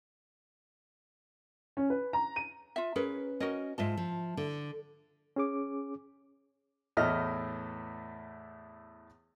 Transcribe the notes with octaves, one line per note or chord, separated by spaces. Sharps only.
C#4
B4
A#5
D#7
F4 E5
C#4 G#4 A#4 B4
C#4 F#4 A#4 D#5
G#2 F4 D#5 E5 A5
F3
D3
C#4 G#4 D6
E2 A2 A3 D#5 F6